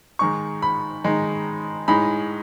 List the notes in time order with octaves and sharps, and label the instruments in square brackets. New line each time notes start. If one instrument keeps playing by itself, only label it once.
[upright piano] D#3 G#3 D#4 C#6
B5
D#3 G#3 D#4
A2 G#3 D#4 B5